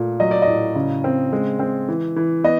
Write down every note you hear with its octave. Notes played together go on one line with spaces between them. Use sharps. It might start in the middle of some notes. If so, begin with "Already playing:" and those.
Already playing: A#2 A3
F#3 D#5
D5
D#5
A2
C#3
C4
G#3
C4
E3
E3
B3 D#5